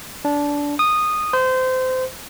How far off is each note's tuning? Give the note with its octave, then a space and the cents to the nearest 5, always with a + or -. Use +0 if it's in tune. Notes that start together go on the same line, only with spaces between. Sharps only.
D4 -20
D#6 -10
C5 -25